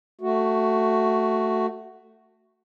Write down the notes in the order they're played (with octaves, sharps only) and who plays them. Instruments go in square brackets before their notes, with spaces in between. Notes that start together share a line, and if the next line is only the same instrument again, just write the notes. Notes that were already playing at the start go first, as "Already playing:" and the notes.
[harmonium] A3 F#4